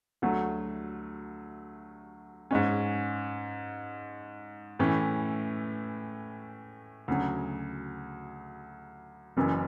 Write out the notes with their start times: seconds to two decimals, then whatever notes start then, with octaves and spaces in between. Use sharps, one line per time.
0.22 D2 D3 F#3 A3
2.51 G#2 G#3 C#4
4.79 A2 E3 A3 C#4 E4
7.08 D2 C#3 F#3
9.37 F#1 F#2 C#3 E3